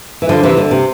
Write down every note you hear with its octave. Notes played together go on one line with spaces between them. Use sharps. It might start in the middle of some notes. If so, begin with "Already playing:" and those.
E3
D3 F3
C3 E3
D3
C3